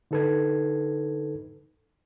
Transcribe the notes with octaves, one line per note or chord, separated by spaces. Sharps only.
D3 D#4 A4 B4 G#6